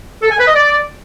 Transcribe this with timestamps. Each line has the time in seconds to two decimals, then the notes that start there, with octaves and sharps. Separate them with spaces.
0.23 A4
0.31 G#5
0.39 B4
0.47 D#5
0.55 D5